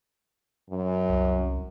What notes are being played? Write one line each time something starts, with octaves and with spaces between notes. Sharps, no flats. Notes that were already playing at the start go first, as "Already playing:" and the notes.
F#2
C2